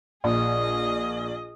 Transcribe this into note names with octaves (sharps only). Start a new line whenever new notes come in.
A#1 G#4 D#5